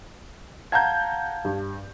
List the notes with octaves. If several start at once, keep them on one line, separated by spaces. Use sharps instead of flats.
F5 F#5 A5 A#5 G6 G#6
G2